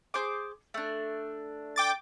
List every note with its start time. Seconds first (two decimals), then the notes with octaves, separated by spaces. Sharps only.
0.14 G#4 C5 D6
0.74 A3 D4
1.76 G5 D6 A6